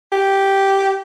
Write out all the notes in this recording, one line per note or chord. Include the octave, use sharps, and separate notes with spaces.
G4